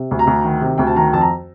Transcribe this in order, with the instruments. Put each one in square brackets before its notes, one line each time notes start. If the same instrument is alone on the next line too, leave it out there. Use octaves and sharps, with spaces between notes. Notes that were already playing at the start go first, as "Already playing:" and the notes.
Already playing: [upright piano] C3
D2
A#5
D2
D#3
C3
D2 G5
A5
D#3 A#5
F2 A5
A#5